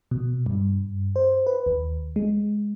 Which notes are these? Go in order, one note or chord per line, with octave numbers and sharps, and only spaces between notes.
B2
G2
C5
B4
D#2
G#3